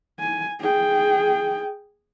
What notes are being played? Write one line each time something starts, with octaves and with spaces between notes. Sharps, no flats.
G#5
G#4 G5